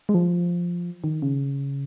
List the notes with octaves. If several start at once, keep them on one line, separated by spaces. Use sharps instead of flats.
G#3
F3
D#3
C#3